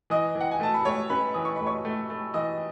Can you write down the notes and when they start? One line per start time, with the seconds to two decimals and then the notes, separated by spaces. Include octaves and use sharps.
0.10 E3 D#5 D#6
0.35 E3
0.41 F#5
0.51 G#5
0.60 A3 A5
0.74 B5
0.85 A3 C#5 C#6
1.10 C#4 B4 B5
1.34 E3 D#6
1.45 C#6
1.56 A3 B5
1.66 C#5 C#6
1.85 A3
2.10 A3
2.34 E3 D#5 D#6